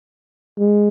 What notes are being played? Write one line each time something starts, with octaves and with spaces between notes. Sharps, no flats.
G#3